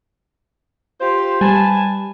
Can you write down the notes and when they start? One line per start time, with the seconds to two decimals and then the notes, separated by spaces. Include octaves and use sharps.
1.00 F4 G4 C5
1.41 G3 B4 G#5 A5